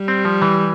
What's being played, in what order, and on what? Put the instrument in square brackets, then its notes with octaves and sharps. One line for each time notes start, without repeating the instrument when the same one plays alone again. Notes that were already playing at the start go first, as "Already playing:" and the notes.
Already playing: [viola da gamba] G3
[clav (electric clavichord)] C4
F3
E3